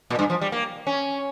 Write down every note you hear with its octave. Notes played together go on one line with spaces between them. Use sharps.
A#2
G2
F3
G3
A#3
C#4